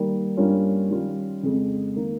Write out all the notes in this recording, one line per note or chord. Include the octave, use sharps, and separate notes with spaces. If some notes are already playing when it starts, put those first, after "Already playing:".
Already playing: D#3 G3 A#3
G2 G3 A#3 C#4 F4
D#3 G3 C#4 F4
F2 C#3 G#3
D#3 A#3